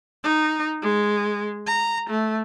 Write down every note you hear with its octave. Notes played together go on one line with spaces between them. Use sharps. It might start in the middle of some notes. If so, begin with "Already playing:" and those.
D#4
G#3
A#5
A3